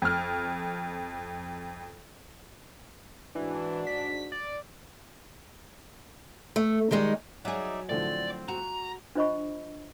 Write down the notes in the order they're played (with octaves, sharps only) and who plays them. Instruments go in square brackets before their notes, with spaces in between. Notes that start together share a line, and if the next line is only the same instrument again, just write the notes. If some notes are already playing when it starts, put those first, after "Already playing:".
[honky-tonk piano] F2 F6
[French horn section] G#2 D4 F#4 [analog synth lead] E3
[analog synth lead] B6
D5
[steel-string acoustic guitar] A3
D#3 G3 G#3 D#4
[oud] F#3 G#4 [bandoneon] D#4 D5 E5
[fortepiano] A2 D3 F3 [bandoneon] C4 [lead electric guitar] D5
[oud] F#4 [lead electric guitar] A#5
[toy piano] D4 F4 C5 D#5 B5 C#6